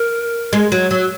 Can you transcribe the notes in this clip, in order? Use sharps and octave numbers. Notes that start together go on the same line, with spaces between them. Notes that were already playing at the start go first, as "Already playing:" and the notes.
Already playing: A#4
G#3
F#3
F#3